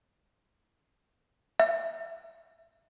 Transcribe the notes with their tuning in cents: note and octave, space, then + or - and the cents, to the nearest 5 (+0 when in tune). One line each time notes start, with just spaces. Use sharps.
E5 +20